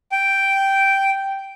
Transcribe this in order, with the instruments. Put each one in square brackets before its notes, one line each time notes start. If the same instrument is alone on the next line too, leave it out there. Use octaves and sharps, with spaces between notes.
[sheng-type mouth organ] G5